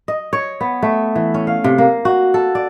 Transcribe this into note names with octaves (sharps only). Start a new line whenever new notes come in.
D#5
C#5
B3
A3
E3
C#4
F5
C3
A#3
F#4
A4
D5